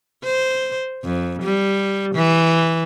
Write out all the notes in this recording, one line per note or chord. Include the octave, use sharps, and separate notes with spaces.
C5
F2
G3
E3